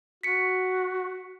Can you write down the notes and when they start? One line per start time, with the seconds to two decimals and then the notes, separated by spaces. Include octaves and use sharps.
0.23 F#4 B6 C#7